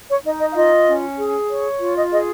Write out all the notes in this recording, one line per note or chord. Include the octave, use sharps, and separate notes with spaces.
C#5
D#4 D#5
D#5
F5
F4 D#5
C#4
G#4
C#5
F4
D#5
G#4 D#5